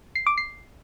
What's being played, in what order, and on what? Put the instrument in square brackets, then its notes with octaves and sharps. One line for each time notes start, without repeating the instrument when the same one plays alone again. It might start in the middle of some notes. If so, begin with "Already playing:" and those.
[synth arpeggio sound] C7
D6
C7